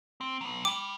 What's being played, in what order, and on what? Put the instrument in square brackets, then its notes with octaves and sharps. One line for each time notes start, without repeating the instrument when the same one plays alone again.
[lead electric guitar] C4
F#3 B3
[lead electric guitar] G5 B5 [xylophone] D6